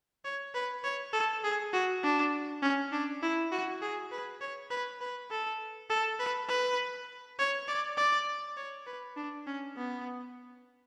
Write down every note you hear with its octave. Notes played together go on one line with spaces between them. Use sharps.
C#5
B4
C#5
A4
G#4
F#4
D4
C#4
D4
E4
F#4
G#4
B4
C#5
B4
B4
A4
A4
B4
B4
C#5
D5
D5
C#5
B4
D4
C#4
B3